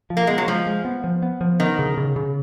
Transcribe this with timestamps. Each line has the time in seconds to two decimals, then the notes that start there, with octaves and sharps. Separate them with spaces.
0.10 F3
0.17 A#3
0.27 G#3 B3
0.38 F#3
0.48 F3 G#3
0.67 G#3
0.85 B3
1.04 F3
1.22 B3
1.41 F3
1.60 D#3 B3
1.79 C#3
1.97 C#3
2.16 C#3